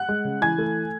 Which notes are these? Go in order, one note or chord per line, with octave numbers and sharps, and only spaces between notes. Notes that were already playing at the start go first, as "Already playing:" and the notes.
Already playing: F#5 F#6
G#3
C#3
E3 G#5 G#6
A3